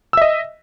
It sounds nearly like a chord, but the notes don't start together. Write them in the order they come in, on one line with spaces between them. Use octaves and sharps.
E6 E5 D#5